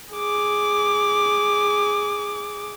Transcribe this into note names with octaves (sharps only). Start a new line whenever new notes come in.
G#4 D6